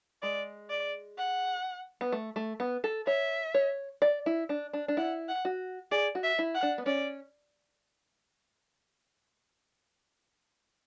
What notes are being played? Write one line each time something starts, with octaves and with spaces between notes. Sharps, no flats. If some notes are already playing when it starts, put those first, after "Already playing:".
G#3 D5
D5
F#5
B3
A3
A3
B3
A4
C#5 E5
C#5
D5
E4
D4
D4
D4
E4 F#5
F#5
F#4
G#4 D5
F#4
E5
E4
F#5
D4
B3
C#4 D5